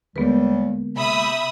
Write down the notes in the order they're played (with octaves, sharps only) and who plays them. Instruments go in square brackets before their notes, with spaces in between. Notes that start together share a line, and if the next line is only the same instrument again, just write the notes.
[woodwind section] D#2 G3 [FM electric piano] D3 G#3 A#3 [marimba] B3 B4
[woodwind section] C3 [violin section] E5 B5 D#6